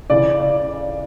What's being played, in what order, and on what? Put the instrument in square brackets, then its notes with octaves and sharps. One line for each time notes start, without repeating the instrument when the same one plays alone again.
[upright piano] C#3 E3 D5
D5